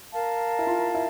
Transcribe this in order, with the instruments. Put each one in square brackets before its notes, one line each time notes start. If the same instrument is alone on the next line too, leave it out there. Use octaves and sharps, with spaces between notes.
[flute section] A#4 F5 A5
[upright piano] E4
F4
E4